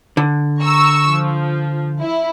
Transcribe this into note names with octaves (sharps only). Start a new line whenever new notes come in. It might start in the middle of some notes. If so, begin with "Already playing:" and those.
D3
A#5 C#6 E6
F3
E4